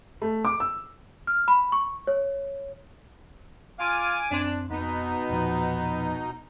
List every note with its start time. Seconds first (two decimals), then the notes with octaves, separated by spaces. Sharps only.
0.22 A3
0.45 D6
0.60 E6
1.27 F6
1.48 B5
1.72 C#6
2.07 C#5
3.79 F4 F5 G#5 D6
4.31 F#2 C4 D4 C6
4.70 F2 B2 B3 D#4
5.30 E2 A#2 F3